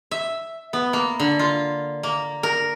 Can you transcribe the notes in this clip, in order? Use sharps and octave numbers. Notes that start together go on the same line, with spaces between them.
E5
B3
A#3
D3
F4
A#3
A#4